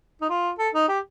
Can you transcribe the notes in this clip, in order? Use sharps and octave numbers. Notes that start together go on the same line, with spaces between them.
D#4
F4
A4
D#4
G4